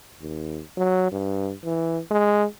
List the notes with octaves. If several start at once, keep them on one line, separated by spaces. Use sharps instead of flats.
D#2
F#3
G2
E3
G#3